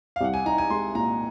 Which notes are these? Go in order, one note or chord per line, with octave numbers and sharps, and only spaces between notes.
F5
C2 F#5
G#5
D#4 A#5
G#5
G#3 C6
A#2 A#5